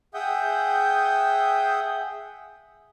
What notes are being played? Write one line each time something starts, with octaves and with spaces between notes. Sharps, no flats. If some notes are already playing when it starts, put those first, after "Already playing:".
G#4 E5 F#5 G5 D#6 G6